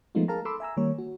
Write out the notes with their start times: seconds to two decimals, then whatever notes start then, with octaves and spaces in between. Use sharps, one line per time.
0.15 F3 G#3 A3 B3 D#4 F4
0.28 G#4 A#4 F5 A5 A#5
0.45 A4 B5 C6 D6 E6
0.60 E5 G#5 A#5 E6
0.77 D#3 G3 A#3 C#5
0.98 F#4